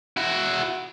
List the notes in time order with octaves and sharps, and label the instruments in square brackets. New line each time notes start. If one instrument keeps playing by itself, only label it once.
[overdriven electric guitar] E4 F#4